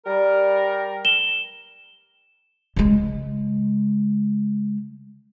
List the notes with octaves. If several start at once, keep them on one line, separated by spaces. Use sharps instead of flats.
G3 A#4
E7 G7
C#3 G#3